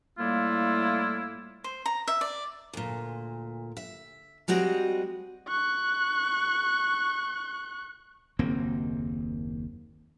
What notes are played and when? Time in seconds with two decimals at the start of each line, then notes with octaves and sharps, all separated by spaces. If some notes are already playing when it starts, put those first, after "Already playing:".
0.18 A2 G3 A3 A#3 E4 F4
1.64 C5
1.86 A#5
2.08 E5
2.21 D5
2.73 D2 A#2
3.77 E5
4.48 G3 G#3 C4 F#4 D#5
5.48 C#6 F#6
8.39 F#1 D#2 A#3 C4